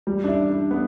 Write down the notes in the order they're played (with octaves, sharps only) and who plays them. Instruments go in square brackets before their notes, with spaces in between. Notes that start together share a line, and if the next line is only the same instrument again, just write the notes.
[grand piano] G3
D4
E4
D4
B3